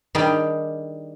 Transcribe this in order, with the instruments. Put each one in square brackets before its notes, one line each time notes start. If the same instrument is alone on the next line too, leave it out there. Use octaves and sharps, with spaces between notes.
[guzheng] D#3 G3 D4 G4 G#4 G5